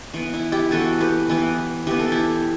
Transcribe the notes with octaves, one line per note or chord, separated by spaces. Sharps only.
E3 B3
E4
E4 G4
E3 B3 F#4 A4
G4 B4
E3 B3
E3 B3 G4
A4
E4 G4